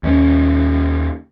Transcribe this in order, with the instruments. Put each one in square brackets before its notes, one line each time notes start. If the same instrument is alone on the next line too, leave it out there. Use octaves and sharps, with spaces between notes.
[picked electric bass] D#2 A3 C#4